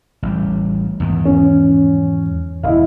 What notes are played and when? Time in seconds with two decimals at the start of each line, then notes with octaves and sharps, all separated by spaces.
0.23 A1 G3
1.00 E2 G#2 D#3
1.25 C#4
2.63 D#1 E4 D#5 F5